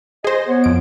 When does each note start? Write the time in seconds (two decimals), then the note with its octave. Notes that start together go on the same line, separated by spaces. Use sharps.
0.24 G#4 C5 D#5 G#5
0.48 B3 C#5
0.64 F2 D7